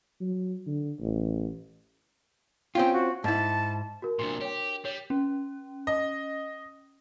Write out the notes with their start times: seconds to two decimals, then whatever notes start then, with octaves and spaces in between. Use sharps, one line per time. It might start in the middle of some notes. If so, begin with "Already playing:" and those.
0.21 F#3
0.67 D3
1.00 A1
2.75 C4 C#4 F4 G5
2.93 F#4
3.24 G#2 E4 A5
4.02 F#4 A#4
4.19 C2 A#2 D4 C6
4.41 G4 C#5 G5
4.85 G3 C#5
5.10 C#4
5.87 D#5